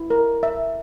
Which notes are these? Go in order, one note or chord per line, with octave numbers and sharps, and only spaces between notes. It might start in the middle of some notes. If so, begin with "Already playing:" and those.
Already playing: E4
A#4
E5